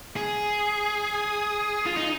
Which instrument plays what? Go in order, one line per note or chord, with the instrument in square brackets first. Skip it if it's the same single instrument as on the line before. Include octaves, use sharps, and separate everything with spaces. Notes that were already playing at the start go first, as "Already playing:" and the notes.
[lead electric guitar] G#4
F4
D#4